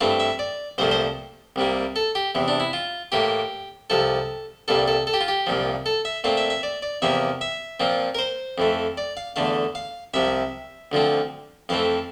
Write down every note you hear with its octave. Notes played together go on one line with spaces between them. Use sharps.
G2 E3 A3 C4 F5
E5
D5
C2 A#2 F3 A3 C5
C5
C2 C3 G3 A#3
A4
G4
E2 C3 E3
D4
E4
F4
A2 E3 A#3 G4
C2 C3 F3 A4
C2 A#2 G3 A4
A4
A4
G4
F4
G4
C2 A#2 F3
A4
E5
A#2 A3 C4 F5
E5
E5
D5
D5
E2 C3 F3 A#3 E5
E5
A#2 F3 C4
A#4
C5
F2 E3 A3
D5
F5
E2 D3 A3 F5
F5
C2 C3 F3 E5
D2 D3 F3 C4
F2 E3 A3 C4 F5